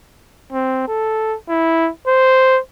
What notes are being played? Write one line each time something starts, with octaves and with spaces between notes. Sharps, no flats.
C4
A4
E4
C5